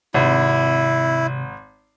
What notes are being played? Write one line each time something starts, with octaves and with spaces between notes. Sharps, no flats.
G#1 C3 E4